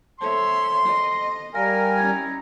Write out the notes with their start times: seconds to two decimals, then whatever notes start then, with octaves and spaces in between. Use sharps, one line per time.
0.21 A4 C5 C#5 E5 A5 C6
0.87 D#5
1.54 G3 A#4 F5 G#5 F6 A#6
1.97 C#4 D#4 E4 G5 A#5 G#6